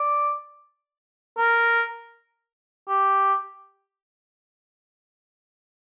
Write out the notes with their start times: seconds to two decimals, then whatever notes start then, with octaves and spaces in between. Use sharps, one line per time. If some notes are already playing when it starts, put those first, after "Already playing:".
Already playing: D5
1.38 A#4
2.89 G4